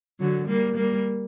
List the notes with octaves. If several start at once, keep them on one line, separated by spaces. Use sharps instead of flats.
D3 F#3
G3 A#3
G3 A#3